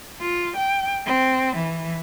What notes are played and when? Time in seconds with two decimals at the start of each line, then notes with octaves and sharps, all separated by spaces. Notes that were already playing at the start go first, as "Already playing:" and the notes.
0.21 F4
0.56 G5
1.06 C4
1.56 E3